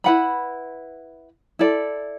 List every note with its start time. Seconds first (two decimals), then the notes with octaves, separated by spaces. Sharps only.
0.04 E4 B4 F#5 B5
1.59 E4 A4 D5